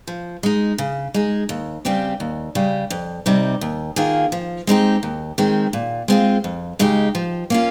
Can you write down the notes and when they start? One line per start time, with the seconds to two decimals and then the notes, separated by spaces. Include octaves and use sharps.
0.07 F3
0.43 G#3 D#4
0.78 C#3
1.14 G#3 D#4 G#4
1.49 D#2
1.85 C#3 G3 C4 G4
2.20 D#2
2.55 C#3 G3
2.90 F2
3.26 C3 G3 C4 D#4
3.61 D#2
3.96 D#3 A#3 F4 G#4
4.32 F3
4.67 G#3 C4 D#4 G4
5.03 D#2
5.38 D#3 G#3 C4
5.73 A#2
6.08 G#3 C4 F4 G#4
6.44 F2
6.79 C#3 G#3 D#4 G4
7.15 F3
7.50 A#3 C#4 F4